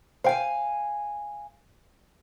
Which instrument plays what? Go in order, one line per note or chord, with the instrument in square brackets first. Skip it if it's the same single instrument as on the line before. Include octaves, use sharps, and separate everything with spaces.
[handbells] C5 G5 [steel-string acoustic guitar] F5 G#5